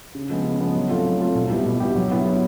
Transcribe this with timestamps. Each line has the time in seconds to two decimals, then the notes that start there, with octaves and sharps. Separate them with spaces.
0.15 C#3
0.30 F3 G#3 B3
0.45 C#3
0.60 F3 G#3 B3
0.76 F#3
0.90 A3 C4 F4 A4
1.05 F#3
1.20 A3 C4 F4 A4
1.35 B2
1.50 G3 B3 E4 G4
1.66 B2
1.80 G3 B3 E4 G4
1.95 F#3
2.11 B3 E4
2.26 F#3